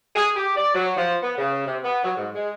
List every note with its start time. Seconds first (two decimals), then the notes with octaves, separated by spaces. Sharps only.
0.16 G#4
0.36 G4
0.56 D5
0.75 F#3
0.97 F3
1.22 B3
1.38 C#3
1.67 C3
1.84 B3
2.04 F#3
2.17 G#2
2.35 G#3